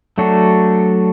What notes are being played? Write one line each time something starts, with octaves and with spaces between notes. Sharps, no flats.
F#3 A3 D4 F#4 A4